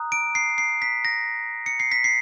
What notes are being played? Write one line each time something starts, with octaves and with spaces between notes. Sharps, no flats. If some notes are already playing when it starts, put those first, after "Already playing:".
Already playing: A#5 D#6 F#6
D7
C7
C7
B6
A#6
C#7
C7
B6
C7